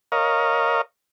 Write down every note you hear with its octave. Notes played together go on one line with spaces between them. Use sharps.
A#4 C#5 D#5 F5